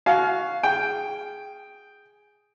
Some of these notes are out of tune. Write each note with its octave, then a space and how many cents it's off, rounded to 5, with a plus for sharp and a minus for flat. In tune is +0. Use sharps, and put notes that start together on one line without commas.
F#4 +0 F5 +0 G#5 +40
G#4 +0 G5 +0